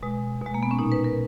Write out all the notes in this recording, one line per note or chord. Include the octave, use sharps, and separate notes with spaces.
B2 G#3
B2 G#3
A#3
B3
C#4
A#2 D#4
B4
A#4